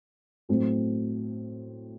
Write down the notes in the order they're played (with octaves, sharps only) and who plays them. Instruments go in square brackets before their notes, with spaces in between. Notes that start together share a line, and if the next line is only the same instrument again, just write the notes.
[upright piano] A2 F#3 A3 C4